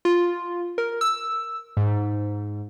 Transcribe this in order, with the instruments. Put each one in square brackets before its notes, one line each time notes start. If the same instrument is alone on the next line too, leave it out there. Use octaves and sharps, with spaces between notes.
[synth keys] F4
A#4
E6
G#2